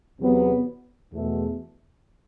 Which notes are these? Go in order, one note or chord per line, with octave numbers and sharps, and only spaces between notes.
E2 C3 F#3 B3
E2 B2 A3